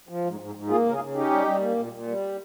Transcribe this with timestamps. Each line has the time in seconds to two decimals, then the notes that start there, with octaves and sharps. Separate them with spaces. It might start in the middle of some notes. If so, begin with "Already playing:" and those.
0.09 F3
0.25 G#2
0.40 G#2
0.55 G#2
0.70 A#3 F4 G#4
0.86 C#3 A#4
0.93 F4 G#4
1.00 C#3
1.15 C#4 D#4 G4
1.31 G3
1.46 G3
1.61 A#3
1.76 A#2
1.93 A#2
2.07 G3